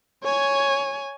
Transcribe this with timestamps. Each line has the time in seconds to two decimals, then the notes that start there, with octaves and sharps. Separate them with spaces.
0.24 C#5 G#5